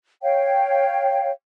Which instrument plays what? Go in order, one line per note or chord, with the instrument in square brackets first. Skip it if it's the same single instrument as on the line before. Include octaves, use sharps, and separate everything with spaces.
[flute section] C#5 F5 G5